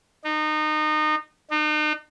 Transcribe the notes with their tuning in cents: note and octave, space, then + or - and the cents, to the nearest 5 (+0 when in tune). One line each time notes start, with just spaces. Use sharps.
D#4 -25
D#4 -40